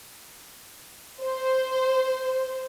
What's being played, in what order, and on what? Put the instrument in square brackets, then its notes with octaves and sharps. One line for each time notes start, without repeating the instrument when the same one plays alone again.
[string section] C5